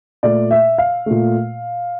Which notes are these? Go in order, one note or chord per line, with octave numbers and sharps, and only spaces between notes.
A#2 A3 D5
E5
F5
A#2 A3